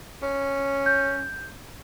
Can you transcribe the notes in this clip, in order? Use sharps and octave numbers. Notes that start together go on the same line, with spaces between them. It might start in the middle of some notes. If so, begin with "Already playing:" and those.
C#4
G6